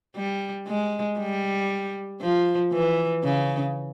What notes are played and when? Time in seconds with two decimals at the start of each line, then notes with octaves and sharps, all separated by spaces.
0.16 G3
0.68 G#3
1.19 G3
2.21 F3
2.72 E3
3.24 C#3